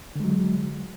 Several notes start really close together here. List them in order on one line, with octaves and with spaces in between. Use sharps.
D3 G#3 F#3